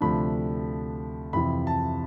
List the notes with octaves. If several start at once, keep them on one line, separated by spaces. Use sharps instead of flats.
D2 C3 F3 A3 D4 B5
F2 C3 E3 B5
A5